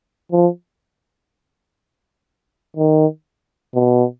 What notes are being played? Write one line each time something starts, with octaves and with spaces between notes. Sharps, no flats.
F3
D#3
B2